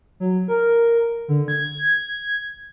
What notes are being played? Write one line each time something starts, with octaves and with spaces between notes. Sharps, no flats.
F#3
A#4
D3
G#6